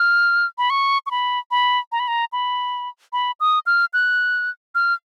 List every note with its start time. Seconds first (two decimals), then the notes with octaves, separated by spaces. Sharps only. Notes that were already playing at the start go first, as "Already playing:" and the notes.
Already playing: F6
0.58 B5
0.70 C#6
1.06 C#6
1.11 B5
1.51 B5
1.92 A#5
2.00 B5
2.08 A#5
2.32 B5
3.13 B5
3.40 D#6
3.66 F6
3.93 F#6
4.75 F6